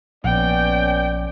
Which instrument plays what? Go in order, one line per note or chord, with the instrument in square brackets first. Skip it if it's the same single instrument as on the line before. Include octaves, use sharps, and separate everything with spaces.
[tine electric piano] A#1 [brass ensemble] B3 C#4 D5 [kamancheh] G5